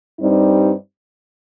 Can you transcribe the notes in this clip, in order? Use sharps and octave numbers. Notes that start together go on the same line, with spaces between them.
G2 G3 C4 D#4